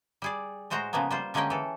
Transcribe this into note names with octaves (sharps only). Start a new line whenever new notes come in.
G3 G#4 D5
A2 G#3 F#4 C5 A#5
C#3 F3 G#3 A#3 B3
G3 F4 C5
D3 G#3 A#3 C#4 D#5 G5
E3 A4